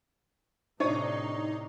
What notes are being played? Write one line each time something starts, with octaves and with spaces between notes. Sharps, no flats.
A2 C3 D4 D#4 C#5 C#6